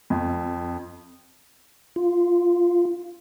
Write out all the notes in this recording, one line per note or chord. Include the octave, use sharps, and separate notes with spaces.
F2
F4